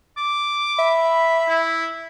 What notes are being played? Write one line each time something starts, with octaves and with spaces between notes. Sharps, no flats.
D6
E5 B5
E4